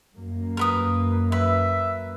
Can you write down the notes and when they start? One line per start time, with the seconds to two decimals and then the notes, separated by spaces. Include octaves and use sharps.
0.16 F#2 A#3
0.57 A#4 B4 D#6
1.32 B4 E5